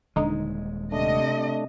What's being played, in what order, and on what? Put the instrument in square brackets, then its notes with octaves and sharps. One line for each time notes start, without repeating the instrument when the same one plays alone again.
[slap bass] D#1 G#3 [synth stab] D3 D#4
[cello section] C3 D#5 [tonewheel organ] A3 D4